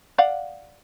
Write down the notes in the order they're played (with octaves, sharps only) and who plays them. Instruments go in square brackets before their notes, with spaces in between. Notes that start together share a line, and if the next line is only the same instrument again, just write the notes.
[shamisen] D5 F5 F#5